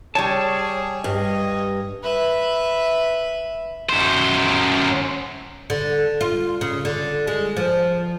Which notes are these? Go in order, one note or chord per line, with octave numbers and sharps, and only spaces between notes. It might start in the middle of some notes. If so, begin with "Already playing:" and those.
G3 G#4 C#5 A5
G2 D#5
B4 E5
F#2 C5
D3
F4
C#3
D3
G#3
F3